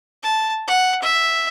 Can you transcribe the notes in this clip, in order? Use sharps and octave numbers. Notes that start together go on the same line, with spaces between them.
A5
F#5
E5